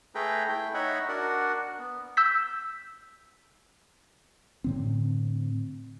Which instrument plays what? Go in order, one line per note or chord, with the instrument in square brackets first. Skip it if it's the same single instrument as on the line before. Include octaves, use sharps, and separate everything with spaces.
[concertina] A3 G#4 A4 B4 G5 A#5
A3 E4 G5
D#4 C#5 D#5 E5 F#5 B5
D4 F#4 A#4 D5 F#5
B3
[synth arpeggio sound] E6 G6 B6
[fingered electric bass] A2 D3 C4